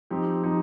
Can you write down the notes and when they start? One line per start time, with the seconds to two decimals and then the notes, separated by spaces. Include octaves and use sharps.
0.10 F3 C4 D#4 G4
0.43 F3 C4 D#4 G4